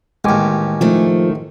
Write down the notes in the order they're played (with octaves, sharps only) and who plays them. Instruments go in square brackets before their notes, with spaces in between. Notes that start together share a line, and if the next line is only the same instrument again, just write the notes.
[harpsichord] A1 D#2 [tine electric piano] G#3 G#5 D6
[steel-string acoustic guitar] D#3 A3 [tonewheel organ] F3